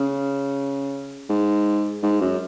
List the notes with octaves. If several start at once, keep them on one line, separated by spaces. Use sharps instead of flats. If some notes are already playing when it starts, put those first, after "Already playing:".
Already playing: C#3
G#2
G#2
F#2